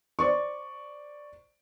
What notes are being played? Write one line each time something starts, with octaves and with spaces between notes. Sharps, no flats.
C5 D5 C#6